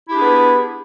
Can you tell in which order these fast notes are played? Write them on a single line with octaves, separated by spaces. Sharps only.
E4 G4 D4 G#4 B3